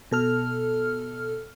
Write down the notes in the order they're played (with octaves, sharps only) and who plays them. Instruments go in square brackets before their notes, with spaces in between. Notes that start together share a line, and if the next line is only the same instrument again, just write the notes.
[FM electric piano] B2 A4 F6